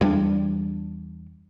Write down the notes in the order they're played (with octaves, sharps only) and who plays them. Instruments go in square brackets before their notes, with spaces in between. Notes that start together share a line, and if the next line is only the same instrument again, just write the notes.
[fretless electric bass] E2 G3 A#3 D4